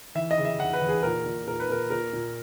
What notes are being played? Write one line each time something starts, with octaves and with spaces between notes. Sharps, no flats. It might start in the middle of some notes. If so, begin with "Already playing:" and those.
E3 E5
D#5
C#3
E5
E2 F#5
B4
E2
G#4
A#2 A#4
A#2
A#2 A#4
B4
A#2 A#4
A#2 A#4
A#2